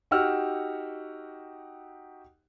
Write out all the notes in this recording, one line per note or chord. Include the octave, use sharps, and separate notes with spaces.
D#4 F#4 G4 F#5 E6 F6